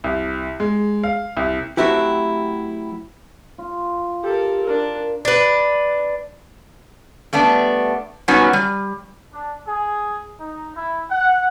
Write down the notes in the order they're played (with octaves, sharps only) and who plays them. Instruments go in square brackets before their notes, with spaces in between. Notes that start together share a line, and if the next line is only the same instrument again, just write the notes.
[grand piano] C2
G#3
F5
C2
[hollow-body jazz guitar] F#3 A3 C4 E4 F#4 G4
[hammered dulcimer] F4
[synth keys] G4 [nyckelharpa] A4 A#4
[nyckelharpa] D4 [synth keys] A#4
[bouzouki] D4 B4
[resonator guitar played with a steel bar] G3 A3 B3 D4
F#3 G3 B3 C#4 D#4 F#4
G3
[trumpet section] D4
G#4
D#4
E4
F#5